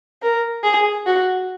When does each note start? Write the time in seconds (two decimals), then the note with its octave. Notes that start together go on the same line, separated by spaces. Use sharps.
0.22 A#4
0.64 G#4
1.06 F#4